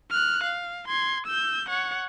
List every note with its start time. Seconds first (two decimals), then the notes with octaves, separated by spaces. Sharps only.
0.11 F6 F#6
0.43 F5
0.88 C6 G#6
1.27 E6 G6
1.69 C#5 F#5